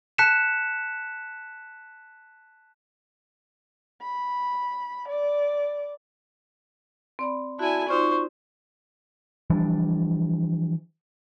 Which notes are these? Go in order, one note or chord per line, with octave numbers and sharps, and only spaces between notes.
A5 F#6 B6 C#7 E7
B5
D5
C4 D5 B5
E4 F#4 D5 G#5 A5
D#4 F4 C5 D5 C#6
E3 F3 G3 D4